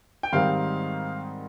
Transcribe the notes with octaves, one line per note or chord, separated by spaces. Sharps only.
G5
G#2 D#3 G3 C4 D#4 F5